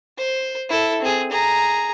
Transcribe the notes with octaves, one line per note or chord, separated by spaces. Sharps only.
C5
E4 A4
C4 G#4
G#4 A#5